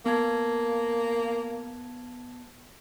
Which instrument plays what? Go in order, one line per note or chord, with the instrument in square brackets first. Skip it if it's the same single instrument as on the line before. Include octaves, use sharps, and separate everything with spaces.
[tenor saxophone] A#3 [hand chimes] B3 A5 G#6